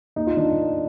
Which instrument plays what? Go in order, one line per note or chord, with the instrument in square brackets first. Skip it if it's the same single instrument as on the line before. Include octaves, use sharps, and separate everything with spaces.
[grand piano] D#2 D#4
F4
D#3 D4